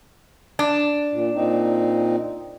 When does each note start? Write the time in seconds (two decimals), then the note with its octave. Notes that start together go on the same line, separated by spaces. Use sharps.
0.59 D4
1.12 A#2
1.35 A#2 C4 D#4